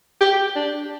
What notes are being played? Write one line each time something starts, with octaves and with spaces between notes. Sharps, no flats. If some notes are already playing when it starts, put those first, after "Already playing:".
G4
D4